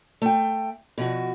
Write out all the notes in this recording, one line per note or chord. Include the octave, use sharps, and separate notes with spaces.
A3 G5
B2 F3 F#4